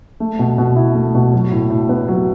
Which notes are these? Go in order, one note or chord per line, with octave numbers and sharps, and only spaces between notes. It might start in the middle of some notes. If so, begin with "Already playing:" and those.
A3
B2
B2
E4
A3
B2
F#3
A2
A2
B3
F#3